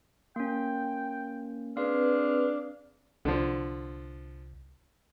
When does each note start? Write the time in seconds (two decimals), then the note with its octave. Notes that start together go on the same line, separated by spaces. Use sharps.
0.36 A#3 C#4 G5
1.77 C4 D4 G#4 B4 F5 F6
3.25 C2 D3 F3